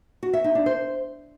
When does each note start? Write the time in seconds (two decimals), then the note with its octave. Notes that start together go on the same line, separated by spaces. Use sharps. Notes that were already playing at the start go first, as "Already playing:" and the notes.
0.23 F#4
0.33 E5
0.44 D#4
0.55 D4
0.66 C5